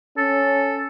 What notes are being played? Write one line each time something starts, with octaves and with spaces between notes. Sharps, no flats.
C#4 A4